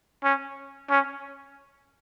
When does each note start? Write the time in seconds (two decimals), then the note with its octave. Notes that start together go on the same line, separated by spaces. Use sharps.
0.24 C#4
0.90 C#4